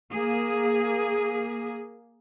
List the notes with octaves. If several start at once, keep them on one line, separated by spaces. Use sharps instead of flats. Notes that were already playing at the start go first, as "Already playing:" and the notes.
A#3 G#4